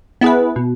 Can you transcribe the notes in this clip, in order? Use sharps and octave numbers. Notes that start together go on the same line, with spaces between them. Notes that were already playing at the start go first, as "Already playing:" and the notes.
B3 E4 G#4 B4
B2